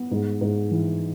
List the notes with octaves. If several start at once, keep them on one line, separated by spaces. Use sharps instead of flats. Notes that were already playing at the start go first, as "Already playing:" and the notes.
Already playing: B3
G#2
G#2
E3